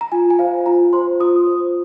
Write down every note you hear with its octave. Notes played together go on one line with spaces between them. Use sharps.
A#5
F4 G#5
G#5
C5 F5
F4 A#5
C5 C6
F4 D#6
C5